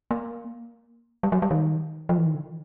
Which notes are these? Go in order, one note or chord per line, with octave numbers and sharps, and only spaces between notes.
A#3
G3
F#3
G3
D#3
F3
E3
D#3
D3